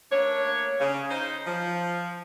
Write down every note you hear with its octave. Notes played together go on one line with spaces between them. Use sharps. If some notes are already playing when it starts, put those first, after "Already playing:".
A3 A#3 D4 C#5
C#3
D#4 C5
F3